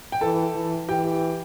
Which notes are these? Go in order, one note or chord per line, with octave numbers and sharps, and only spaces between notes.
G5
E3 A4 A5
E3
E3 G4 G5